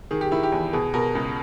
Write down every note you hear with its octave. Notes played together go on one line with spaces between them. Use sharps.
D#3 G#4
G4
D#3 E4
G4
E2
B2 G#4
B2 A#4
C#2